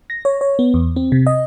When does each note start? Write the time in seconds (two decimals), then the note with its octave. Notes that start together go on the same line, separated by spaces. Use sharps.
0.10 A#6
0.25 C#5
0.41 C#5
0.59 B3
0.74 E2
0.96 C4
1.12 C3
1.27 D#5